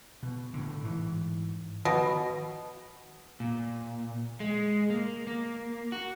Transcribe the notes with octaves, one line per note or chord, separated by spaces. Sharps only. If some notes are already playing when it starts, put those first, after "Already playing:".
B2
A2 D3
G#2 E3
B2 D#3 F3
A#2
G#3
A#3
A#3
F#4